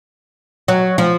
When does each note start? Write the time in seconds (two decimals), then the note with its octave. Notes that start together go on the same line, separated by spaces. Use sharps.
0.68 F#3
0.98 F3